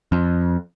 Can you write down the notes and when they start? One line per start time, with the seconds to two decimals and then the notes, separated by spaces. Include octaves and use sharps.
0.12 F2